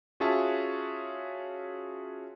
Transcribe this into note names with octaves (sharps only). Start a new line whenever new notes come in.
C#4 F4 F#4 G#4 E5 A5